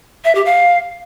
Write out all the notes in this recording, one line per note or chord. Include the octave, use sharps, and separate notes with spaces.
E5
G4
F5